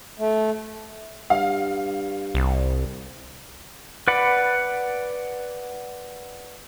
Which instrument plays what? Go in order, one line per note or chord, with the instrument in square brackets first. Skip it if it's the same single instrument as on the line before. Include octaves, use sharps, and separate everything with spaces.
[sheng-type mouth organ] A3
[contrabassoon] G2 [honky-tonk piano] F5
[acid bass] C2
[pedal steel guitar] B4 D5 F#5 B5